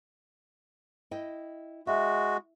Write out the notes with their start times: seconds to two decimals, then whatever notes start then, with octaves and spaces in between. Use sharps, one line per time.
1.11 E4 D#5 G5
1.87 G#3 F#4 E5